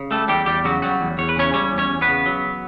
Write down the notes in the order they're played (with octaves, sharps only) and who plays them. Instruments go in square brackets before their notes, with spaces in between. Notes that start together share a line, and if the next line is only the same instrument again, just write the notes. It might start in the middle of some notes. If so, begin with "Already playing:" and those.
Already playing: [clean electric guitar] C#3
G3 A3 A4
E2 G3 G4
E2 G3 G4
C#3 F#3 F#4
F#3 G3 F#4
E2
E2 C#5
B4
C#3 C#4 C#5
G3 C#4 C#5
E2
C#4 C#5
E2
B3 B4
C#3
F#3